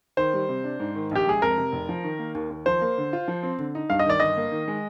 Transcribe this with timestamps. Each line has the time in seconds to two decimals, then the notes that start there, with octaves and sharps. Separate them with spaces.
0.17 D#3 C5
0.34 G3
0.49 C3
0.64 D4
0.80 G#2
0.95 D#3
1.11 A#1 G4
1.26 G#3 G#4
1.42 F2 A#4
1.58 C3
1.72 F1
1.89 F3
2.04 D#3
2.19 A#3
2.35 D#2
2.50 D#2
2.66 F3 C5
2.81 A#3
2.98 D3
3.13 F4
3.28 F3
3.43 C4
3.59 D3
3.75 D#4
3.90 G2 F5
3.99 D#5
4.06 D#3 D5
4.20 G1 D#5
4.37 A#3
4.52 D#3
4.68 G#3